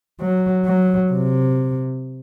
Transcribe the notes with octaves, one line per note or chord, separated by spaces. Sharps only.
F#3
F#3
C3